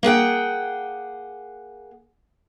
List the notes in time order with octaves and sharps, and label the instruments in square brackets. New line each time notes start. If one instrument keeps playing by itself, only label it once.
[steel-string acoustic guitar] A#3 G#4 F#5 G5